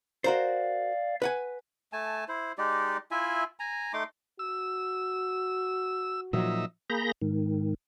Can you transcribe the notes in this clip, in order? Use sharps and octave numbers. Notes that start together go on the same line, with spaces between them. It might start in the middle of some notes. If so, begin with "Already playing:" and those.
F#4 A#4 C5 D5 F5
B4 F#5 G#5
A3 G#5 A5
E4 C5
G#3 D#4 G4 D5
E4 F4 E5 G#5
G#5 A#5
A3 D#4 C6 D6
F#4 E6
A#2 F3 F#3 D#4 E5
A#3 G#4 A#5 B5 G6 A#6
G#2 D#3